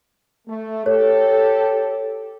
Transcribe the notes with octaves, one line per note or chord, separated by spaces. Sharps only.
A3
G4 A4 C#5